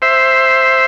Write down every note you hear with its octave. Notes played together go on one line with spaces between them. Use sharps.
C5 E5